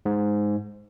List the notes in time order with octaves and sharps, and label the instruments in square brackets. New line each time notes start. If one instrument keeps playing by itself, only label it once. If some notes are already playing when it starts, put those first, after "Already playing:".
[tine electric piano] G#2